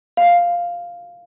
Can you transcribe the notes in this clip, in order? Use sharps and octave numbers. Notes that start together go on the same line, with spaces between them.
F5